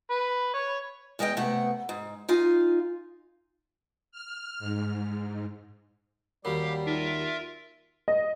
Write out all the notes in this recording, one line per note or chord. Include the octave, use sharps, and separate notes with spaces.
B4
C#5
E2 G#3 D#5 F5 G5
C3 A3 B3 F#5
G#2
D#4 F4 F5 G#5
F6
G#2
D#2 F#3 G3 G4 A#4 F5 B5
D#4 F4 A#4 E5
D#5